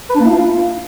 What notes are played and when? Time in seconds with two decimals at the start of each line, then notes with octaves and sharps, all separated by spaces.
0.10 B4
0.15 D4
0.20 A#3
0.25 E4
0.30 F4